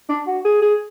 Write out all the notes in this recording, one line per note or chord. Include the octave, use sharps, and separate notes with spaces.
D4
F#4
G#4
G#4